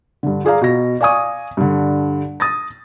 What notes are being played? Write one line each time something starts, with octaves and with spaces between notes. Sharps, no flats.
G2 D3
F4 G#4 D5 F5 A#5
B2 A#6
D5 F5 G#5 C#6 D#6
G2 D3
D#6 A6 A#6